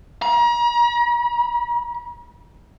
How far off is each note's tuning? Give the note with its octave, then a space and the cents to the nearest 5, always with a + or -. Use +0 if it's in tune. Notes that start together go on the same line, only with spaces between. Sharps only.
A#5 +40